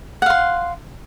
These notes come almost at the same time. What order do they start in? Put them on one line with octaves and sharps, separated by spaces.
F#5 F5 C6